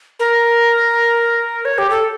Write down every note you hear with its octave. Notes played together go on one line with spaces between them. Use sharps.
A#4
C#5
G4
A4